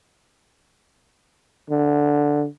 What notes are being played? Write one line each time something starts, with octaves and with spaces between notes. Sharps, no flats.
D3